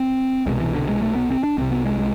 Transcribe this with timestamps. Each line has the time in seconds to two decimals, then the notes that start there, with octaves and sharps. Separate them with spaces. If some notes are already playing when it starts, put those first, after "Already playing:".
Already playing: C4
0.46 C2 B2 G#3
0.60 E3
0.75 D3
0.89 G#3
1.02 A3
1.15 B3
1.30 C4
1.43 D4
1.58 C2 C3 C4
1.71 B3
1.85 G#3
1.99 G#3